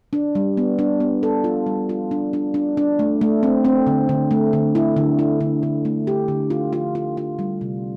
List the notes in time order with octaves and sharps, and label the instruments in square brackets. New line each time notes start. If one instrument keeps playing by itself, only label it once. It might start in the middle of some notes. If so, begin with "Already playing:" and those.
[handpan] D4
G3
B3
D4
B3
A4
F4
G3
F4
D4
D4
D4
D4
A3
A3
C4
C4
D3
D3
A3
D3
E4
D3
E4
D3
D3
A3
G4
D3
F4
F4
F4
F4
G3
C3